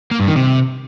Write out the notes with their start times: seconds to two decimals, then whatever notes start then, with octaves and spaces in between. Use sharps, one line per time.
0.11 A#3
0.20 G2
0.28 D#3
0.36 C3